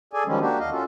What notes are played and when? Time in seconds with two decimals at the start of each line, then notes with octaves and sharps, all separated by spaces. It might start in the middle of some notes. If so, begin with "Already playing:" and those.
0.13 G#4 A4 D5 G#5
0.27 D#3 F3 G3 G#3 C#4
0.40 A#3 D4 F#4 G4
0.59 D#2 D#5 F5
0.72 C#4 F4 F#4 A4